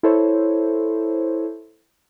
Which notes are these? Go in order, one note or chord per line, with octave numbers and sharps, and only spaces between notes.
E4 A4 C5 C#5